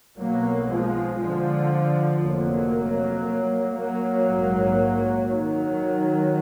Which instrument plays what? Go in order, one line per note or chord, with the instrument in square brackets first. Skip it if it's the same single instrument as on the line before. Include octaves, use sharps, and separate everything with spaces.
[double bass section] B1 B2 F#3 A#3
F3 G#3
D3 F3
F1 F2 F#3 A#3
F#3 A#3
A#1 G#2
D#3 F#3